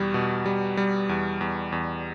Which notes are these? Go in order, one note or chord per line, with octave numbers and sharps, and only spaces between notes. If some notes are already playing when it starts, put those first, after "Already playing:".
Already playing: E2 B2 G3
B2
G3
G3
E2
E2
E2